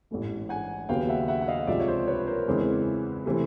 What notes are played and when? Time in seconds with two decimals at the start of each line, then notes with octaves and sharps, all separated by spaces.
0.11 A1 G#2 E3 A3
0.49 F#5 G#5
0.89 D#2 C#3 F#3 B3 F5 G5
1.09 E5 F#5
1.28 E5 F#5
1.41 F#5
1.48 D#5 F5
1.67 C#2 C3 F3 G#3 D5 E5
1.80 C#5
1.87 C5 D5
2.07 B4 C#5
2.27 A#4 C5
2.46 E2 C#3 E3 G#3 C4
3.26 C3 E3 A3 C4